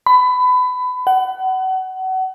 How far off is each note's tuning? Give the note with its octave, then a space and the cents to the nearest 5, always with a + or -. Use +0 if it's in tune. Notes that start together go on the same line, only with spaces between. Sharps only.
B5 +25
F#5 +30